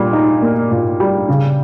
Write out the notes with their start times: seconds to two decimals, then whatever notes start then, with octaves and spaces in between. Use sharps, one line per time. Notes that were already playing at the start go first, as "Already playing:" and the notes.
Already playing: A#2 G3
0.13 D#4
0.42 A#3
0.71 A#2
1.00 G3
1.28 C#3